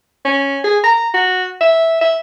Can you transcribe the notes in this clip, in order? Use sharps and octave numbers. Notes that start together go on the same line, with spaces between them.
C#4
G#4
A#5
F#4
E5
E5